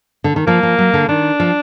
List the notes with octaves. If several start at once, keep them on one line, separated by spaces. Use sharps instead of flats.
D3
D#3
F3 A#3
F3
F#3
D3
D#3 D4
F3